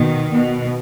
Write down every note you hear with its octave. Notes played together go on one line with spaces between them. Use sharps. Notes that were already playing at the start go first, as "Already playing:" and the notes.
Already playing: B2 D#3
B2